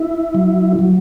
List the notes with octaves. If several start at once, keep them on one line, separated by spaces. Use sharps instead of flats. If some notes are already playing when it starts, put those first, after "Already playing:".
Already playing: E4
F#3
F#3